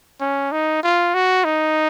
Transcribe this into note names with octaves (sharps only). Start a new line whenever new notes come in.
C#4
D#4
F4
F#4
D#4